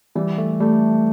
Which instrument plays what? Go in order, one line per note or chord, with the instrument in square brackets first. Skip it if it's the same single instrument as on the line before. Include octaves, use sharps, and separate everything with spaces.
[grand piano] E3 [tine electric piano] G3
[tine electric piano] A3
[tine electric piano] G3 [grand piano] A3